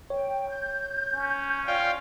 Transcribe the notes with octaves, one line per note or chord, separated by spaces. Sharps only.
C#5 G5
G6
C#4
F4 D5 F5 G5